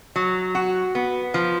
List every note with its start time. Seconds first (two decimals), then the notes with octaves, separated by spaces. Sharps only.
0.16 F#3
0.55 F#4
0.95 B3
1.34 F3